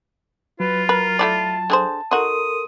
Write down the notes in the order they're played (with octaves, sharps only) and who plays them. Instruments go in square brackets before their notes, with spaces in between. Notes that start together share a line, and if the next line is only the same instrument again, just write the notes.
[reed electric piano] F#3 [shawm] F4 [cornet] B4
[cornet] A#4 [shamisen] B4
[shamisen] A3 E4 D5 [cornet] A5
[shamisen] D3 G#4 C5
[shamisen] D#4 F#4 [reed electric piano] A4 A#4 C6 [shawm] D#6